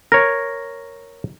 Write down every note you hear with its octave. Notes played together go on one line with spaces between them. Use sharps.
A#4 C#5 A#6